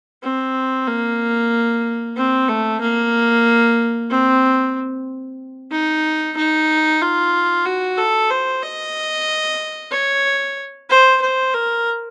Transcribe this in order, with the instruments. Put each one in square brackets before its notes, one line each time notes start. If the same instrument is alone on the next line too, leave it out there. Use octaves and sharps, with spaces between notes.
[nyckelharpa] C4
A#3
C4
A3
A#3
C4
D#4
D#4
F4
F#4
A4
C5
D#5
C#5
C5
C5
A#4